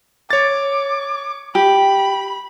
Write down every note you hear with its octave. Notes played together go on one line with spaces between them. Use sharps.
C#5 D6 A6
G4 B5